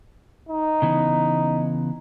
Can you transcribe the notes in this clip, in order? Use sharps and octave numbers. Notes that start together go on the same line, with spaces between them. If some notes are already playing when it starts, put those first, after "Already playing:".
D#4
C#3 E3 B3